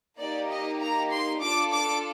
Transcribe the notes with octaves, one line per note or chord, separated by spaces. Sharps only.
A#3 D#4 G4 D5
D#5
A#5
C6
D4 F4 A4 D6
D6